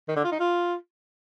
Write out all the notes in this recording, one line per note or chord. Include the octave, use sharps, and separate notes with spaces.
D#3
D3
F4
D#4
F4